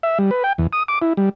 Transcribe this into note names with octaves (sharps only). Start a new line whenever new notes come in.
E5
G3
B4
G5
E2
D#6
D6
E4
G3